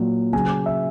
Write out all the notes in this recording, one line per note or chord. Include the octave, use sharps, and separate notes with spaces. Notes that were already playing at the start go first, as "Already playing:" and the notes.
Already playing: A#2 F#3
C#3 F#3 G#5
E5